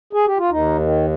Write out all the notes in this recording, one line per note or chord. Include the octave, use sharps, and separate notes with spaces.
G#4
G4
F4
D#2 D#4
D#3